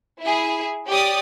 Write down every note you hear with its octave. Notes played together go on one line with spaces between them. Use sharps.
E4 G#4
G4 C#5 D5 D6 D#6